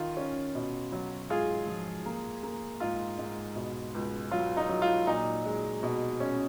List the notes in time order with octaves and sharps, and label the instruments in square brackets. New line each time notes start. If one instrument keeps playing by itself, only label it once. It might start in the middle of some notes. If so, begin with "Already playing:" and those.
Already playing: [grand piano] D#3 F4
C#4
B2
F#3
G#2 F4 G#4
F3
A#3
A#3
G#2 F4
G#2
B2
C#2
F#3 F4
D#4
F#3
F4
A#2 D#4
G#3
B2
C#4